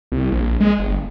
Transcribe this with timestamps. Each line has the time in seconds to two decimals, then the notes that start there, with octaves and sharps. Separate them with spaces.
0.12 C2
0.32 A#1
0.60 G#3
0.79 G1